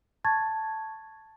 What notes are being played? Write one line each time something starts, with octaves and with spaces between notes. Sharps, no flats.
A5 C#6 G#6 A6